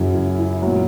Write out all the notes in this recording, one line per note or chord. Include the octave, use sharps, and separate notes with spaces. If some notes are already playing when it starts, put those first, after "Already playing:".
Already playing: F#2 C#3 F#3 E4
E4
E4
F#3
A#2